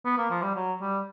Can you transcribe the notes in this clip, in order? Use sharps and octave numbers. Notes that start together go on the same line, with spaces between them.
B3
A#3
F3
G3
F#3
G3